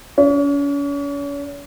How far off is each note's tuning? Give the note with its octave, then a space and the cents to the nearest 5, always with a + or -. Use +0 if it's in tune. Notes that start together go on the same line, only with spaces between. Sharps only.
C#4 +40